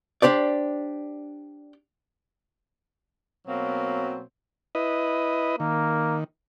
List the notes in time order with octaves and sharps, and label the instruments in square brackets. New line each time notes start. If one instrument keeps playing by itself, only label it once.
[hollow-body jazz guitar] D4 G4 C5 D5
[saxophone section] B2 F#3 A#3 C4
[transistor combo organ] E4 B4 D#5
[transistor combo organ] D#3 [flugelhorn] A#3